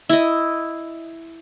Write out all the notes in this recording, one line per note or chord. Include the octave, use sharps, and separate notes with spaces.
E4 D#5